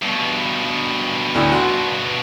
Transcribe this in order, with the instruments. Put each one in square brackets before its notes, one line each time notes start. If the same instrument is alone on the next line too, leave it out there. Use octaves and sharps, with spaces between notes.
[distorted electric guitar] G2 B2
[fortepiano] D2 A2
F#4 C6